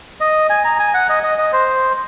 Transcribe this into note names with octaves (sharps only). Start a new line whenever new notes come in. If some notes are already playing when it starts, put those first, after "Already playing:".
D#5
G#5
A#5
G#5
F#5
D#5
D#5
D#5
C5